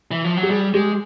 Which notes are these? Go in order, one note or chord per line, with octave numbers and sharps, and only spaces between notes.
E3
F3
F#3
G4
G3 G#4
G#3 G4